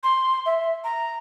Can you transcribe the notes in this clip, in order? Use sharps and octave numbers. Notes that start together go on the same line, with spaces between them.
C6
E5
A#5